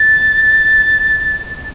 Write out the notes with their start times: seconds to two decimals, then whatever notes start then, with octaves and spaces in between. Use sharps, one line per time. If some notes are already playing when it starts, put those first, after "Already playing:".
Already playing: A6